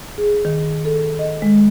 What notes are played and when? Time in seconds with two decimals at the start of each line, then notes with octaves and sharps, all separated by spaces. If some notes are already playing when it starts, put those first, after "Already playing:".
0.18 G#4
0.45 D#3
0.85 A4
1.19 D#5
1.42 G#3